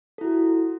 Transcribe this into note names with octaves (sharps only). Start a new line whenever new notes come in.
E4 F#4 A4